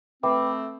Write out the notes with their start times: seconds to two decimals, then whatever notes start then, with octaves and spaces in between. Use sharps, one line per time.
0.23 A3 C4 B4 E5 G5 B5 D6